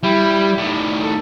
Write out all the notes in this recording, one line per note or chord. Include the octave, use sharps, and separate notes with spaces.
G3 E4
A2 D#3 D5
A4